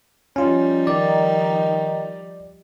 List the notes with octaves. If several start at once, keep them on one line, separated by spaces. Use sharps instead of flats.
F3 G3 C#4 D#4 F4
D#3 D5